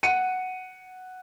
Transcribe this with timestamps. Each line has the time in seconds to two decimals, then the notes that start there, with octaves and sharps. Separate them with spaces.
0.03 F#5 C#7 D#7